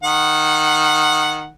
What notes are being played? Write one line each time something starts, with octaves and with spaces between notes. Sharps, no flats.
D#3 F#5